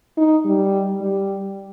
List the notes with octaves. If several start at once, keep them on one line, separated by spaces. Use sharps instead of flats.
D#4
G3
G3